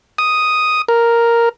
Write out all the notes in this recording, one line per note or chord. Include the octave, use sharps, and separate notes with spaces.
D#6
A#4